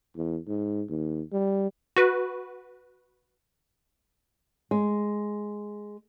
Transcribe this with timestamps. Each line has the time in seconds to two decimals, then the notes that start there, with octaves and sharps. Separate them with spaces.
0.16 E2
0.47 G#2
0.89 D#2
1.32 G3
1.96 F#4 B4
4.71 G#3